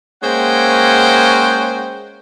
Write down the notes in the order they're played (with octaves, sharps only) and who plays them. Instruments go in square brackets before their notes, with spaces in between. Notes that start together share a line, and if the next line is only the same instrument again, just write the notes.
[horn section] G#3 A#3 C#4 C5 F#5 G5